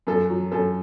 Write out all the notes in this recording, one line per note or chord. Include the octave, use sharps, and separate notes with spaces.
F#2 A4
F#3
F#2 A4